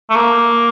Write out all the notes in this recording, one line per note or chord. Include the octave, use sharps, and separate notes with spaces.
A3
A#3